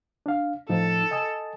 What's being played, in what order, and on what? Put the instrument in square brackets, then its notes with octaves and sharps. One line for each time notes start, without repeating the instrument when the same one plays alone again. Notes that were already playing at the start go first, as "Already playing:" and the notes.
[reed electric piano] D4 F5
[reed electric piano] A2 F3 D#4 [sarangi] A4
[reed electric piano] D#5 G#5 D#6